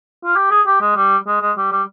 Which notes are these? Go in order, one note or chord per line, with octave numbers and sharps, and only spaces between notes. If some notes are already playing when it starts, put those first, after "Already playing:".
F4
G4
G#4
G4
G#3
G3
G#3
G#3
G3
G3